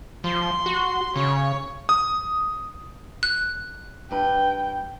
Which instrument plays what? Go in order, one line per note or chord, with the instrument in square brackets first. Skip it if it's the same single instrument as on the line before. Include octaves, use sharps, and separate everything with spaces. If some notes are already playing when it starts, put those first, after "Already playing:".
[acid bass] F3 [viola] C6
[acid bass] F#4
[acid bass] C#3 [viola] C#5
[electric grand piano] D#6
[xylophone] F#6
[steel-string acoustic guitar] G2 B4 [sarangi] G5